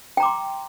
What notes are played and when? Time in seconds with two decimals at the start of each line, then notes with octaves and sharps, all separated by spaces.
0.17 G5
0.20 A#5
0.23 D6
0.25 C6